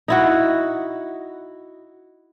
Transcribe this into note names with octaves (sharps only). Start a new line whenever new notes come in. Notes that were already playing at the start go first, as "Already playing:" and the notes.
D#4 E4 F#4